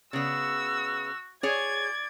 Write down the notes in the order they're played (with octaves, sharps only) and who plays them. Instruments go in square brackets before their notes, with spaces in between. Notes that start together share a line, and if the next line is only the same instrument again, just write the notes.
[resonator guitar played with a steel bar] C#3 B3 [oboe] F#4 [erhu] E6
[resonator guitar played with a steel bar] G#4 C#5 [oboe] D5 [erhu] G#6